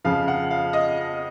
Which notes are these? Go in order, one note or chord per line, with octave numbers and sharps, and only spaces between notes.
F2 C#3 F3 F5
F#5
F5
D#5